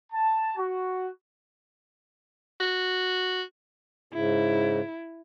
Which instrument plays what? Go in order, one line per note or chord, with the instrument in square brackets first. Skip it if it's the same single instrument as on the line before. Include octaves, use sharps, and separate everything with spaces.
[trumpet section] A5
F#4
[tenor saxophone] F#4
[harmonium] G#2 C#3 [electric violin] E4